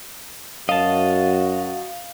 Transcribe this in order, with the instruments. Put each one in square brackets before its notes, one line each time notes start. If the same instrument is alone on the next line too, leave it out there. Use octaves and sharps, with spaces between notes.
[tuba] F#2 [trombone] F#4 [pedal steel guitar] D#5 A5 [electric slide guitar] F5